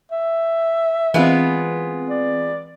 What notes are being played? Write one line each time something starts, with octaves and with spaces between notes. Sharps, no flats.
E5
E3 G#3 B3 C4 F4
D5